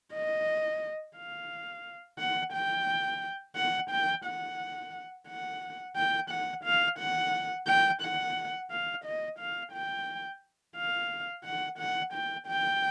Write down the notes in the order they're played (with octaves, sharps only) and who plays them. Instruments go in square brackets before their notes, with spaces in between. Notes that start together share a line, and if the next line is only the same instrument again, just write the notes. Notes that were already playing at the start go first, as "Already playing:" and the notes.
[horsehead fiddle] D#5
F5
F#5
G5
F#5
G5
F#5
F#5
G5
F#5
F5
F#5
G5
F#5
F5
D#5
F5
G5
F5
F#5
F#5
G5
G5